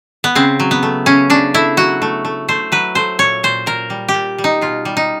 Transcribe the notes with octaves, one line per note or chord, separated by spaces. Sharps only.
B3
C#3 C4
F#3
B3
A3
C#3 C#4
C#3 D4
A3 E4
F#3 F#4
A3
A3
A3 C5
F#3 B4
A3 C5
A#2 C#5
A#2 C5
A#2 A#4
G3
G4
A#2
G3
D#4
B2 F4
G3
D#4